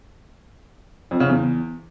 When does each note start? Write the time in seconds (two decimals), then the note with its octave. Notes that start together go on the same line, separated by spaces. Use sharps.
1.11 F2
1.20 C#3
1.29 E2